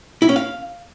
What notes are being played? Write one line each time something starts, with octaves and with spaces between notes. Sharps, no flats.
E4
C#4
F5